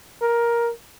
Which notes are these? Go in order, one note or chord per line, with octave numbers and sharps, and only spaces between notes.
A#4